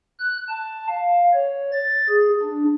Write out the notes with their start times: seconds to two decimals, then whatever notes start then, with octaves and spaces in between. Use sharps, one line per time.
0.20 F#6
0.49 A5
0.89 F5
1.34 C#5
1.72 A6
2.10 G#4
2.43 D4